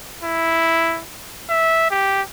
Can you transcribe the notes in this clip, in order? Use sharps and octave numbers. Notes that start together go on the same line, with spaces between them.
E4
E5
G4